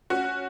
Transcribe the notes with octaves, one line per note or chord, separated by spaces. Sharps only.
C#4 F#4